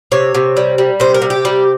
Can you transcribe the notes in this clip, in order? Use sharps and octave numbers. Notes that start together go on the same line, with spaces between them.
C3 C#5
C3
G3
G3
C3 C5
A#4
C3
G4
G3